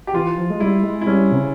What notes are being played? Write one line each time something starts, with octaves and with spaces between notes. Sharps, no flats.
G4
E3 F4
F3
G#3
G3 E4
G#3
E4
G3 C#4
C3
C#3